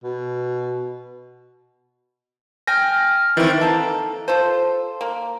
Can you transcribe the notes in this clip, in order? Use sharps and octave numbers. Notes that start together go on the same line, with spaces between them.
B2
G5 G#5 F6 A#6
D#3 E3 C4 A6
D#3 A#3 A4
F4 A4 C5
A#3